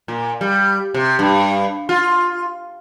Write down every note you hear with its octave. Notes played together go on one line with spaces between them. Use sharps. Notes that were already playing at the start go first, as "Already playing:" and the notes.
A#2
G3
C3
G2
F4